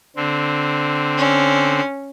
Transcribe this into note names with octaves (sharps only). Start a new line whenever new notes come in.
D3 C4
C#4